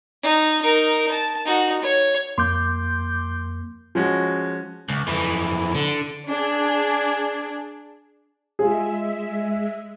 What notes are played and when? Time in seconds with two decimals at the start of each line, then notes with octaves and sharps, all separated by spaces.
0.23 D#4
0.62 D#4 A#4
1.12 A5
1.46 D#4 F#4
1.82 C#5
2.38 F2 A#3 C6 D6 G6
3.95 F3 G#3 C#4 F#4
4.89 C#2
5.07 F2 E3
5.75 D3
6.27 D4 G#4
8.59 G#3 F4 G#4 E5